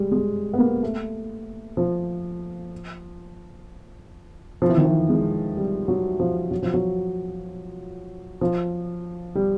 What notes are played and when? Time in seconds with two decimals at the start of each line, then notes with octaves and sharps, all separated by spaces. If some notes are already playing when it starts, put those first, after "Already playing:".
Already playing: G3 G#3
0.11 G#3
0.53 B3
0.59 A#3
0.83 A3
1.77 F3
4.62 F3
4.69 E3
4.77 D#3
4.85 E3
5.09 G#3
5.57 G3
5.88 F#3
6.20 F3
6.51 F#3
6.63 F3
6.74 F#3
8.41 F3
9.35 G3